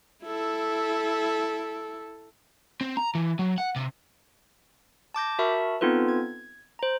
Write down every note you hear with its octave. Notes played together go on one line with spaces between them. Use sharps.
E4 A4
C4
A#5
E3
F#3
F#5
C3
A5 D6 G6 A#6
F#4 A#4 E5 A5 B5 C#6
B3 C4 D#4 F4 A4 B4
G#6
C5 A#5